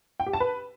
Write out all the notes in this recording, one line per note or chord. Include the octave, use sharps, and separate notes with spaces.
G5
G4
A5
B4